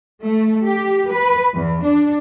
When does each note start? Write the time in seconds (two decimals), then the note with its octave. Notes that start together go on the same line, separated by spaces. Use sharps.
0.21 A3
0.64 G4
1.12 B4
1.54 E2
1.84 D4